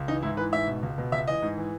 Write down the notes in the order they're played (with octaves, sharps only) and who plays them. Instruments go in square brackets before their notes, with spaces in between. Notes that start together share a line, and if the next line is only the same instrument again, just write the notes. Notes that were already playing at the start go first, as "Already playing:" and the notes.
Already playing: [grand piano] C#2
E3 D#4
G#2 E4
E3 B4
G#2 E5
B2
C#2
B2
C#2 E5
E3 D#5
G#2
E3